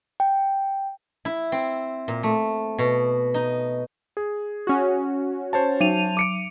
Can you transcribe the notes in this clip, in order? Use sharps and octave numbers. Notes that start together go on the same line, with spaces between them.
G5
E4
C4
A#2
A3
B2
D#4
G#4
C#4 F#4
C5 C#5 A5
F#3 D#7 F7
D6 C#7 D7